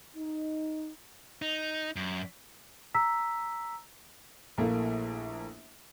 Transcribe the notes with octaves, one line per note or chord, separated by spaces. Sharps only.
D#4
D#4
F#2
A#5 E6 B6
A#1 A3 A#3 E4